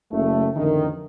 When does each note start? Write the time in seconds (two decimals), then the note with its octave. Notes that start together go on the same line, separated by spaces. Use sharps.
0.11 F#1 A3
0.56 A1 F2 D3 D#3